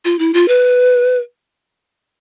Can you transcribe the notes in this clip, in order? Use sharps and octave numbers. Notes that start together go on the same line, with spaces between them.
F4
E4
F4
B4